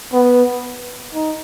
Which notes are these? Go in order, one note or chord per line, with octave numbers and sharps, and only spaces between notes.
B3
D#4